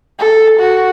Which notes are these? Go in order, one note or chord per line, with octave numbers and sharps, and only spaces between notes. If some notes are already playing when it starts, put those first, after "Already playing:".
A4
F#4